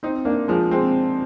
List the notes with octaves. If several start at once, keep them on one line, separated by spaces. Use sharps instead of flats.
C4 D#4
A#3 D4
F3 G#3
G#3 C4